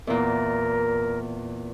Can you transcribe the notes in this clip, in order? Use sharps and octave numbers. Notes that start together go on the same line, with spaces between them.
E2 A#2 A#4